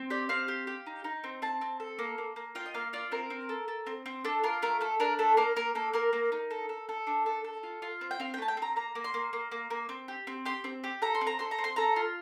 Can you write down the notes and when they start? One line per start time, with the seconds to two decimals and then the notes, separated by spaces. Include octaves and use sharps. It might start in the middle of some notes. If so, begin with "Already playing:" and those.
Already playing: C4
0.10 G4 D5
0.29 C4 F5
0.48 G4
0.67 G4
0.86 D#4
1.04 D#4
1.24 C4
1.42 C4 A5
1.61 C4
1.80 A4
1.99 A#3
2.18 A#3
2.36 A#3
2.55 F4 G5
2.66 D#5
2.74 A#3 F5
2.93 F4 D5
3.12 C4 A#4
3.30 C4
3.49 A4
3.68 A4
3.87 C4
4.06 C4
4.25 D4 A4
4.44 F4 A#4
4.62 A3 A#4
4.81 A3 A4
5.00 D4 A#4
5.19 A3 A4
5.37 A#3 A#4
5.56 A#3 A#4
5.75 A#3 A4
5.93 A#3 A#4
6.13 A#3
6.32 D#4
6.51 A4
6.69 A4
6.89 A4
7.07 D4
7.26 A4
7.44 A4
7.63 F4
7.82 F4
8.01 C4
8.11 G5
8.20 C4 F5
8.34 G5
8.38 A3 A5
8.48 G5
8.57 C4 A#5
8.76 A#3 A#5
8.95 A#3
9.04 C6
9.14 A#3
9.33 A#3
9.51 A#3
9.70 A#3
9.89 C4
10.08 G4
10.27 C4
10.45 G4 C6
10.64 C4
10.84 G4
11.02 A4 A#5
11.15 C6
11.21 C4
11.27 A#5
11.39 A4 C6
11.51 A#5
11.59 C4
11.64 C6
11.76 A4 A#5
11.96 F4